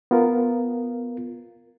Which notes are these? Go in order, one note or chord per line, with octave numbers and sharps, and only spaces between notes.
B3 F4 A#4